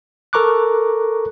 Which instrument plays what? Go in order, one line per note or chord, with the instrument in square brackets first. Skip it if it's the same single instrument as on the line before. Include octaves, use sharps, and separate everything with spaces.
[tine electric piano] A4 A#4 A#5 C#6 D6 F#6